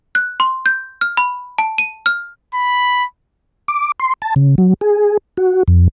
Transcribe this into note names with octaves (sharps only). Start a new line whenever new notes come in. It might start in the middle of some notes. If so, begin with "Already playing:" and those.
F#6
C6
G6
F6
B5
A5
D#7
F6
B5
D6
C6
A5
C#3
F#3
G#4
F#4
F2